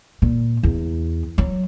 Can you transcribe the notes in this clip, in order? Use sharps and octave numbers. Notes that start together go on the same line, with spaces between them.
A#2
E2
F#3